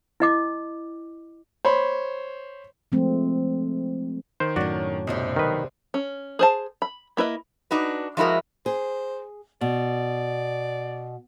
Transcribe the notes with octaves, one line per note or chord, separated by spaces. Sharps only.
E4 D#5 D6
C5 C#5 B5
F3 G#3 A3 C4
D#3 C5
F#2 A2 F#3 D4 F#4 D5
B1 C3 G3 C4 D#5
D#3 B4
C#4
G#4 C5 A5
B5
A#3 E4 B4 D#5
D4 D#4 F#4 B4
F3 G#3 E4 F#4 A#4
G#4 C5
B2 D5